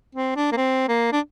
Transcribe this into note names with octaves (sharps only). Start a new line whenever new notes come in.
C4
D4
A#3
C4
A#3
D4